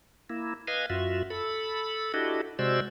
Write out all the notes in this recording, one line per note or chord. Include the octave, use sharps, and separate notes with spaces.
A#3 E4
B4 D#5 F5 G#5
F#2 F4 F#4 E5
A4 B5
D4 E4 F#4 G4 A4 D#5
C3 G#3 F#4 C5 D5 E6